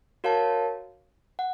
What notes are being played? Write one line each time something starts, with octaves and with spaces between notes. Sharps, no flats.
F#4 A#4 C#5 F5 A5
F#5